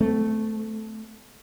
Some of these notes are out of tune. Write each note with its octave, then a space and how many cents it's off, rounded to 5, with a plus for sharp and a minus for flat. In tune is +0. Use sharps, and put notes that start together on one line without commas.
A3 -5 C4 -35